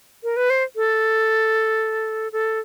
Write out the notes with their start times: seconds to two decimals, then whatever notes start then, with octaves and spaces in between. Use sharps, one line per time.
0.24 A#4
0.37 B4
0.50 C5
0.76 A4
2.32 A4